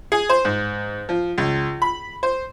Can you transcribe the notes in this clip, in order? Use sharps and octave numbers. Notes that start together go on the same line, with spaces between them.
G#4
C5
G#2
F3
C#2
B5
C5